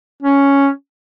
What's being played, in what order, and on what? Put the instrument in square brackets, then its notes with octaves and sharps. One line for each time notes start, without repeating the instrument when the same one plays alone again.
[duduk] C#4